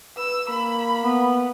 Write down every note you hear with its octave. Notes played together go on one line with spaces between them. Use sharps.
B4 E6
A#3 B5
B3